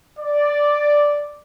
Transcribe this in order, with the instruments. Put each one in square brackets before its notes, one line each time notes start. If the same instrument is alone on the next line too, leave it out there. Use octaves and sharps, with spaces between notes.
[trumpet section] D5